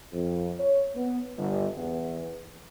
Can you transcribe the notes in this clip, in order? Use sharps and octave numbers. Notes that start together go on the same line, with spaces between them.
F2
C#5
B3
G1
E2